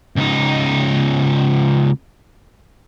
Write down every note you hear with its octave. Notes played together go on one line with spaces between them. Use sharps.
C#2 D#4